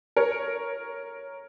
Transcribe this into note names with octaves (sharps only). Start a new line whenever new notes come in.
A#4 C#5